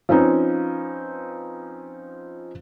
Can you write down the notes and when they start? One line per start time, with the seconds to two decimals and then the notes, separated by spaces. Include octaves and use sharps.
0.09 F3 C4 C#4 D#4 B4